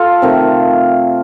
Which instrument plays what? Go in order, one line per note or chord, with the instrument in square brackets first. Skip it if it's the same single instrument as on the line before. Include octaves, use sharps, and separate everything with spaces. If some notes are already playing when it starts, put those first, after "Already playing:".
Already playing: [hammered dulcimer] F4 A4
C3 D#3 A3